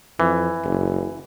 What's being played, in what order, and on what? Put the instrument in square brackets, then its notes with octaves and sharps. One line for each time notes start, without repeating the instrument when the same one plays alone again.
[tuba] F2 [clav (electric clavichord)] E3
[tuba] F#1